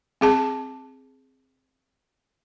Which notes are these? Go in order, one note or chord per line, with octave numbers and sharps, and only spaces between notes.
C4 G#4 A5